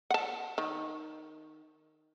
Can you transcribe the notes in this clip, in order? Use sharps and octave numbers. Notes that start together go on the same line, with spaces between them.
F#5 A5
D#3